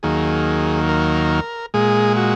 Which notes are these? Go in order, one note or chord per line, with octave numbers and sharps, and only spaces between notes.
D#2 D#3 F#3 A#3 G#4
A#4
A#2 G#3 G#4
F#4